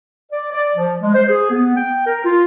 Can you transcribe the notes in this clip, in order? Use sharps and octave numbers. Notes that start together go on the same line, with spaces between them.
D5
D5
F3
G#3
C5
G#4
B3
G5
A#4
F4